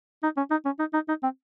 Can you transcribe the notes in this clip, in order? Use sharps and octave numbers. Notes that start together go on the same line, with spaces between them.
D#4
C#4
D#4
C#4
D#4
D#4
D#4
C4